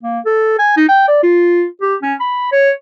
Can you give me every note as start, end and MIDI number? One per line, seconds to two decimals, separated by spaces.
0.03 0.19 58
0.26 0.54 69
0.59 0.74 80
0.77 0.84 63
0.88 1.03 79
1.08 1.18 74
1.23 1.65 65
1.82 1.96 67
2.02 2.14 61
2.20 2.52 83
2.52 2.71 73